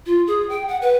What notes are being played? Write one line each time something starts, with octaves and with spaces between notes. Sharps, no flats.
F4
G#4
G5
F#5
B4